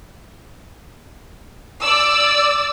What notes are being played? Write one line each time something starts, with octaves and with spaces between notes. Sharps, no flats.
D5 E6